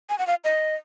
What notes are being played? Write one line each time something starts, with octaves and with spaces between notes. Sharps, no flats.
G#5
F#5
F5
D#5